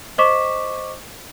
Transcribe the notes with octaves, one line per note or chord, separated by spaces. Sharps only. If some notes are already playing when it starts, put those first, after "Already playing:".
C5 D#5 C#6 D6 B6 E7